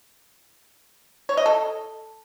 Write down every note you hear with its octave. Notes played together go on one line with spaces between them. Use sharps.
C#5
D#5
A4